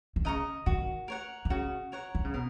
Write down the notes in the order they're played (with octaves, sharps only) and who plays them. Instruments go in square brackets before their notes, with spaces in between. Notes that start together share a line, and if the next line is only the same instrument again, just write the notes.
[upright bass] D#3
[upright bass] C#3 [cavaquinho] D#5 A#5 C#6
[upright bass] D#3 [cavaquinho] F#4
[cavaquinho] A#4 C#5 F#5
[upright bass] D#3
[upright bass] C#3 [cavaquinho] F#4
[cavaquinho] A#4 C#5 F#5
[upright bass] D#3
C#3
[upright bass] B2 [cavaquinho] A#4